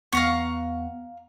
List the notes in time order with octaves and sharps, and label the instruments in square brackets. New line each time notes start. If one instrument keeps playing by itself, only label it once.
[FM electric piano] E2 B3 F#5 [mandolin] F5 A#5 C#6